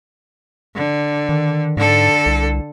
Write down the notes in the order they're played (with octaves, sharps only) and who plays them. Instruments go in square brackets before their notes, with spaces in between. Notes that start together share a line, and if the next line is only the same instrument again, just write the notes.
[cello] D3
[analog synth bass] D#3
[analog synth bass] G#2 [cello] D3 A4
[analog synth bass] C2